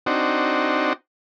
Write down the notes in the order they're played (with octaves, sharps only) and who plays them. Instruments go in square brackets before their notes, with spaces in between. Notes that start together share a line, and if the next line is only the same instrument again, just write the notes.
[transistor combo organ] C4 D4 D#4 F#4